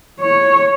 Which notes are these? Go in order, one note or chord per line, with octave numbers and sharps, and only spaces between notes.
C#5